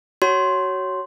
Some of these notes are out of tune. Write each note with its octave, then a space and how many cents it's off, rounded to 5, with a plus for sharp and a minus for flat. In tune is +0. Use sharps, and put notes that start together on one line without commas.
F#4 +25 C#5 +0 C6 +0